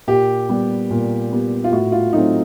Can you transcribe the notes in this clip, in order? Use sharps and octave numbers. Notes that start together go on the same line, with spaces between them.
A#2 G4
G3 B3
A#2
G3 B3
F4
A2 F#4
F4
F#3 A3 C4 D#4